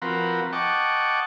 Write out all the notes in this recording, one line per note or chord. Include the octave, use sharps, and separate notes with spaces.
F3 C4 F#4 A#4 B4
D#5 F#5 G5 A5 C#6 D6